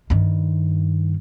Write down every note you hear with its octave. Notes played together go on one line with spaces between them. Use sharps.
G2 D#3